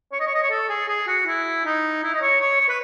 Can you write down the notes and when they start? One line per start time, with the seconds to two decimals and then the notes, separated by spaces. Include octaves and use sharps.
0.12 C#5
0.20 D#5
0.27 C#5
0.34 D#5
0.42 C#5
0.50 A4
0.69 G#4
0.88 G#4
1.07 F#4
1.26 E4
1.65 D#4
2.03 E4
2.14 D#5
2.21 C#5
2.40 C#5
2.60 C#5
2.69 B4